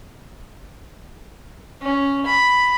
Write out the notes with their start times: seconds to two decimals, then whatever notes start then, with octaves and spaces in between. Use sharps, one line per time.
1.82 C#4
2.26 B5